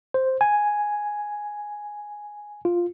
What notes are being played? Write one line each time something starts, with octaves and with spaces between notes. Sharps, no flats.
C5
G#5
F4